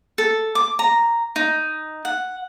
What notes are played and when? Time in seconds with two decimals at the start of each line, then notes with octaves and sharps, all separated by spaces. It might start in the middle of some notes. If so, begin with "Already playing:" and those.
0.18 A4
0.55 D6
0.79 A#5
1.36 D#4
2.05 F#5